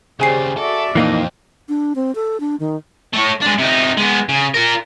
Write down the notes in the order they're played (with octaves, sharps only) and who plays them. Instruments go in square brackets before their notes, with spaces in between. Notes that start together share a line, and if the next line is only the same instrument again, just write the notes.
[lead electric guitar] D#2 C#3 [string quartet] G4 C5 D5 [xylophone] G#4 G#5 C7
[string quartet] F#4 D5 E5 [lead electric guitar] A4
[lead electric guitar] F2 [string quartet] A#2 [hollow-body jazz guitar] E3 A#3 D#4
[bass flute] D4
C4
A4
D4
D#3
[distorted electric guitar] A3 C#5
G#3 D4
C3 D#4
G#3 B3
C#3
F4 A#4